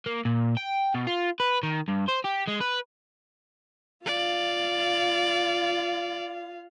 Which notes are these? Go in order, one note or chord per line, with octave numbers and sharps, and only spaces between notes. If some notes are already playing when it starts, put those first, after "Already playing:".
A#3
A#2
G5
B2
F4
B4
D#3
G2
C5
G4
G#3
B4
F4 D5 F5